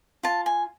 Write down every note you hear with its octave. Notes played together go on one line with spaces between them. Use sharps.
F4 A5
G#5